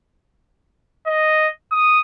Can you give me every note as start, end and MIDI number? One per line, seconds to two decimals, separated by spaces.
1.07 1.48 75
1.72 2.00 87